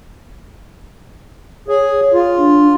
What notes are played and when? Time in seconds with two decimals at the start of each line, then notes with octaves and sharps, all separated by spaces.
1.68 G#4 C#5
2.14 F4
2.38 D4